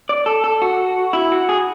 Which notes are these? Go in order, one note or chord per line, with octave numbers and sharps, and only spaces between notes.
D5
A4
A4
F#4
E4
F#4
G#4